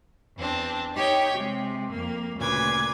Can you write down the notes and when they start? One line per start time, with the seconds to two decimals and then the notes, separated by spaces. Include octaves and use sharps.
0.36 E2 C4 D4
0.94 D#4 G4 C#5 G5
1.35 C3 G#3
1.89 F2 A#3
2.38 D2 A#2 C#3 B4 D6 G#6